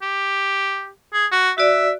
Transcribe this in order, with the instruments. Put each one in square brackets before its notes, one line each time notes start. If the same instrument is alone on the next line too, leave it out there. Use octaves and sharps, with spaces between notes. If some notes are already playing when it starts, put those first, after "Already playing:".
[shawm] G4
G#4
F#4
[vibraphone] F#4 D5 [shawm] E5